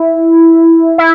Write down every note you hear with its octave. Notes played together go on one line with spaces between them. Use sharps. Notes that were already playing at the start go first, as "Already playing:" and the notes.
Already playing: E4
E4